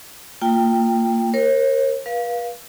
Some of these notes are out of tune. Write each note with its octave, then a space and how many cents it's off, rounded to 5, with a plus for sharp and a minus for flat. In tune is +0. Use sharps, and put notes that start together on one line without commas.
A#3 -25 F4 +0 G5 +10
A#4 +0 C#5 -45
B4 -40 F5 +0